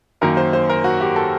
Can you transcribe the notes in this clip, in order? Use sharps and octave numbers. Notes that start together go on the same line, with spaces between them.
F#2 D#3 F#3 A#3 A#4
C5
C5
A#4
F#4
G4
A4